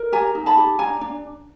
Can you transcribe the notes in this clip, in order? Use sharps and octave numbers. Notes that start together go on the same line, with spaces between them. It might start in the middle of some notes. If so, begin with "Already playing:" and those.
Already playing: A#4
G4 G#5 A#5
D#4
A5 B5
G4
D4 G#5 A#5
D4